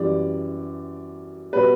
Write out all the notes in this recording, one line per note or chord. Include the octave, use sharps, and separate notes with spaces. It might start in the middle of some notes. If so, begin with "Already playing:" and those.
Already playing: F#2 E3 G3 D5
B2 G3 B4